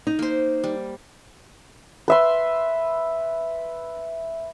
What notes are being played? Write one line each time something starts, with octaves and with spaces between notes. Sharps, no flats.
D#4
A#3 C5
G3
B4 E5 C6